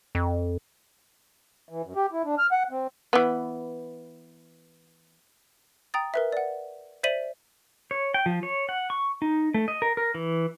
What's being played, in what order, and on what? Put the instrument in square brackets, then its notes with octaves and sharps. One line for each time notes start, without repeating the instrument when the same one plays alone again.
[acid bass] F2
[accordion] E3
F#2
G4
E4
D4
F6
F#5
C4
[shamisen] E3 B3
[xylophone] G5 A#5 D#6 A6
A#4 B4 E5
D5 F#5
C5 D5 E5 B6 D#7 F#7
[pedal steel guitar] C#5
G5
F3
C#5
F#5
C#6
D#4
A3
D#5
A#4
A#4
E3